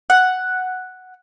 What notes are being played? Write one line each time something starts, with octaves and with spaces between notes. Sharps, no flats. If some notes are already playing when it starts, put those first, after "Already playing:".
F#5